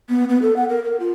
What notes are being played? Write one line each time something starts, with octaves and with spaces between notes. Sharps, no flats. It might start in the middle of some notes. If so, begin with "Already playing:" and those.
B3
B3
A4
F#5
A#4
A#4
F4